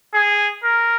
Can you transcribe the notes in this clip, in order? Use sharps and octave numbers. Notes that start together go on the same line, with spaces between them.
G#4
A#4